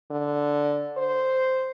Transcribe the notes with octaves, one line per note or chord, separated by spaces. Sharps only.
D3
C5